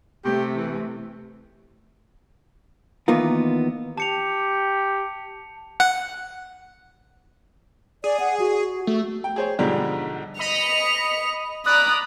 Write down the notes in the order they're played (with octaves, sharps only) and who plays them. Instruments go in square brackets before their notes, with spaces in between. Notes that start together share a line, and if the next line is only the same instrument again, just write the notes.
[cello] C3 A3 [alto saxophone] G4
[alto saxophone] E3
[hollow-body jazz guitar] D#3 E3 A#3 B3 D#4 F4
[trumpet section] G4 [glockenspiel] A5 C#7 F7
[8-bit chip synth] F#5
[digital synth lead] G#4 [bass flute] D5
[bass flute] F#5
F#4
[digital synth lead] A3 [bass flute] F#4
[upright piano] G5
G#4 C5 C#5
B1 G#2 D3 F3 G3 G#3
[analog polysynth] D#5 B5 D#6 [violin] C#7 F7
[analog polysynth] D5 [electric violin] A#5 D#6 [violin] B5 [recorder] F#6